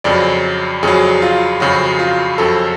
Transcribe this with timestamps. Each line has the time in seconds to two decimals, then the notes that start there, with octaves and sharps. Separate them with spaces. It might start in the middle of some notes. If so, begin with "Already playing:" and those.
0.04 F2 C#3 F#3 D5
0.83 F2 C#3 F#3 G#4
1.22 F4
1.60 F2 C#3 F#3 F#4
1.99 F4
2.38 F2 C#3 F#3 A4